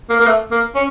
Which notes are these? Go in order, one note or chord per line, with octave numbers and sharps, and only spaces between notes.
A#3
A#3
A3
A#3
C#4